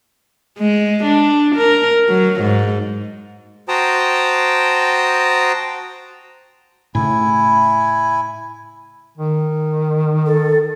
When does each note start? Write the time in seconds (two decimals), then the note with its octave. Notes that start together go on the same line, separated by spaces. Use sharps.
0.58 G#3
1.04 D4
1.55 A#4
2.09 F#3
2.41 G#2
3.68 F#4 C5 G5 A5 A#5 D#6
6.95 A2 C#3 E4 G#5
9.17 D#3
10.26 A4